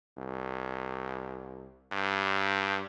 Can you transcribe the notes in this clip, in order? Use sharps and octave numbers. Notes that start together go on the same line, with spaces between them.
C2
G2